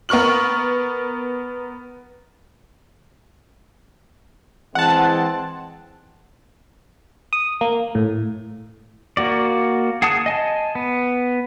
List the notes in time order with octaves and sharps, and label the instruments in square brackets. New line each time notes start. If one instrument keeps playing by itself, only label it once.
[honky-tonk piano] B3 A#4 C#6 F6 F#7
[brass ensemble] E3 G#3 C4 [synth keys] F#5 A5
[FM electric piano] D#6
A#3
A2
[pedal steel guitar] A#3 F#4 D5
G#4 F#5 A5 D#6
D#5 G#5 A5
B3